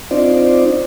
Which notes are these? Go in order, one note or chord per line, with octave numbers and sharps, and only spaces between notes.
C4 D4 D#4 F4 C5 D5